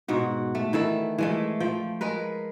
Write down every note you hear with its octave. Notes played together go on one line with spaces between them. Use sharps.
G#2 B2 F#4
A3
D#3 E3 E4 A4
E3 G#3 A3
F3 G5
G#3 A#4 B4